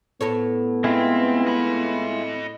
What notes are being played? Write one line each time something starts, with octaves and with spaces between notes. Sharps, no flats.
A2 B3 A4 C#5
G#3 C4 E4 F4
D#5 B5